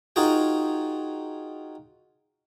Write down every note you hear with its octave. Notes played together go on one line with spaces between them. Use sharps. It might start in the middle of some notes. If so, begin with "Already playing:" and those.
D#4 F4 F#4 G#4 A#4 G5